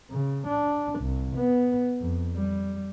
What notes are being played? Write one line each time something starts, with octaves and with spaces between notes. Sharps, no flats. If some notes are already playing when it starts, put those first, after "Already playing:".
C#3
D4
C2
B3
F2
G3